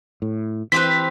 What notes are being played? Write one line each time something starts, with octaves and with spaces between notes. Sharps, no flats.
A2
E3 C4 G4 B4 B6